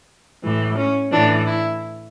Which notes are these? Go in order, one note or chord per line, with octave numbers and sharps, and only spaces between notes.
A2 E3
C#4
A2 E3 D4
E4